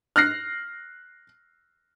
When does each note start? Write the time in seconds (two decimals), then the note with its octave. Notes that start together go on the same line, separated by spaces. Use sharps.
0.16 F6 F#6 A#6 C7